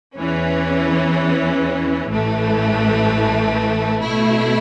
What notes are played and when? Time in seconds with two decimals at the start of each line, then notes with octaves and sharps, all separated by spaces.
0.16 E2 E3 C#4
2.09 A1 A2 E3 A3
4.02 B2 A3 E4